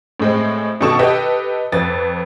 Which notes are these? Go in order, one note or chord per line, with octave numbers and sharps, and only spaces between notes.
A2 G#3 C4
B2 D#3 A4 C#6 E7
G4 A4 B4 D#5 G5
F2 B4 A6